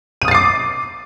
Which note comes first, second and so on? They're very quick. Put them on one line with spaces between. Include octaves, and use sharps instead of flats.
D#7 D#6 A6 C7 D6